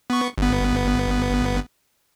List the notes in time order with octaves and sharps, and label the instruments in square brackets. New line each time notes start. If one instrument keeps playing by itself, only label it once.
[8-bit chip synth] B3 C#6
G1 B3